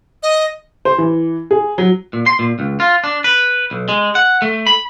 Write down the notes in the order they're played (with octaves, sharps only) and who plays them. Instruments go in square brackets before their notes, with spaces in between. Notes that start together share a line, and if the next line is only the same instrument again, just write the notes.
[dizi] D#5
[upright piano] C5
E3
G#4
F#3
[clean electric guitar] A#2
C6
A#2
C#2
F4
D4
B4
B1
G#3
F#5
A3
B5